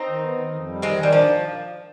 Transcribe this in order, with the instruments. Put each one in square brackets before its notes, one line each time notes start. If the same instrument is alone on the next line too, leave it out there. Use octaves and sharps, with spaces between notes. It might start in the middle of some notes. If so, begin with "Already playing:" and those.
Already playing: [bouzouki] C4 D#4
[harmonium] D#3
B3
D#3
F2
G3
[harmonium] D#3 [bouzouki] G#3 C4
[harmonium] D#3
[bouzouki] G3
[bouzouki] F3 [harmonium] D4